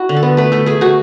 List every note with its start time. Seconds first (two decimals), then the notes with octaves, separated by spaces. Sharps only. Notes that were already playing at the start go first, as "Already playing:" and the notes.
Already playing: E4 F#4
0.09 D3
0.17 A4
0.23 B3
0.37 A3 B4
0.52 A3 A4
0.66 A3 G#4
0.81 A3 F#4